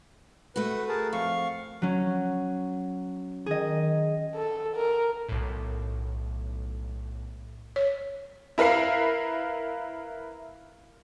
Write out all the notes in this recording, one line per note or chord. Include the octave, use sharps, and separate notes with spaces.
A3 F#4 B4
G#4 A#4 A5
F2 F5 C#6
F#3 C#4
D#3 G#4 D#5
A4
A#4
B1 A2
C#5
E4 A#4 B4 F5 C7